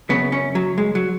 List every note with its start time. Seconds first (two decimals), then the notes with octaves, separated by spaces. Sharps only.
0.10 F#2 C#3 B3
0.32 C#4
0.55 F#3
0.78 G#3
0.95 F#3